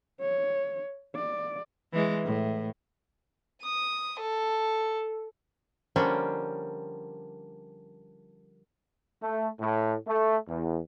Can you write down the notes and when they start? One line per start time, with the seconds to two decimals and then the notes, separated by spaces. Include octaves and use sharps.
0.20 C#5
1.15 D5
1.93 E3 G#3
2.25 A2
3.63 D#6
4.21 A4
5.96 D3 F3 G3 A#3 C#4 D4
9.23 A3
9.60 A2
10.07 A3
10.48 E2